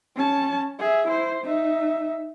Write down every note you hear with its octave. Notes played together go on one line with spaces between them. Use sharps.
C#4 A5
G#4 E5
E4 C5
D#4 E5